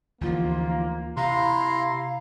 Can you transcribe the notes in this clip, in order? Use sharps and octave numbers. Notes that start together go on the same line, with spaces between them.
D2 E3 F3 A#3 F4
C3 E4 F5 A#5 C6